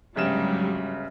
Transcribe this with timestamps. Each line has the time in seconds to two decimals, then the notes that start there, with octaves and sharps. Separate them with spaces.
0.16 G1 G#2 C#3 F#3 G3 E7